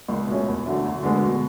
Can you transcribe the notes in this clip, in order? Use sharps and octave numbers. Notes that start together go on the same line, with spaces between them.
C#2
B2 A3 C#4
E2
D3 F#3 A3
D2
D3 G#3 B3
B2